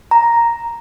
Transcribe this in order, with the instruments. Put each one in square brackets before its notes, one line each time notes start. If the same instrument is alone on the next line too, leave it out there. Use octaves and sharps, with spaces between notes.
[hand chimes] A#5